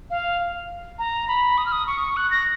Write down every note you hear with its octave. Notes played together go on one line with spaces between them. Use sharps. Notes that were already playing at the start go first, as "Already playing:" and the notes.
F5
A#5
B5
D#6
F6
D#6
C#6
F#6
A#6